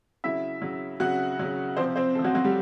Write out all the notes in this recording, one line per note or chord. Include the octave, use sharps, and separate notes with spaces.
C#3 F#3 E4 E5
C#3 F#3
C#3 F#3 F#4 F#5
C#3 F#3
C3 F3 C4 C5
C4 C5
C3 F3 A3 A4
F#3 F#4
F#3 F#4
G3 G4